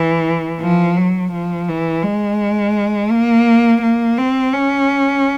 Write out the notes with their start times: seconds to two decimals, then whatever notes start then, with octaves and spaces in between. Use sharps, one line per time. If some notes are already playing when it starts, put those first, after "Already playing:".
Already playing: E3
0.61 F3
0.96 F#3
1.33 F3
1.68 E3
2.03 G#3
3.11 A#3
3.82 A#3
4.18 C4
4.53 C#4